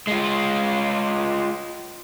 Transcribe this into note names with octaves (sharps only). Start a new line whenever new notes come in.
G#3 F4